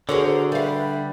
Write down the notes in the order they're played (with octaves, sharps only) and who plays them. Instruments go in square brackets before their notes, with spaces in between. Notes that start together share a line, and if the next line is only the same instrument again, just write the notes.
[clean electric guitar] D3 [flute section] F#4 C5 [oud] G#4 A#4 C#5
[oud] G3 F5 [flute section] B4 E5 B5